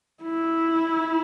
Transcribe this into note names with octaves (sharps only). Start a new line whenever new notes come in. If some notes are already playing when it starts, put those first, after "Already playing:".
E4